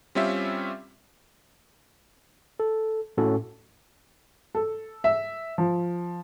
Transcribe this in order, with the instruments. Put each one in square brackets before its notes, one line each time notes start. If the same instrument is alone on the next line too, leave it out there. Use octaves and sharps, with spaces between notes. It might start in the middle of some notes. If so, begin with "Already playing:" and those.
[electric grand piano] G3 C4 C#4 F4 G4 E5
[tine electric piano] A4
A2 C#4 F#4 A4
[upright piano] A4
E5
F3